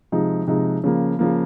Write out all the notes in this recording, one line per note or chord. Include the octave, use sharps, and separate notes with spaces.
C3 F3 G#3 D#4
C3 F3 G#3 D#4
C#3 F3 A#3
C#3 F3 A#3